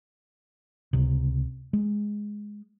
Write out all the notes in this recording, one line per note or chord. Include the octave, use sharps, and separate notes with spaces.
C#2 C3
G#3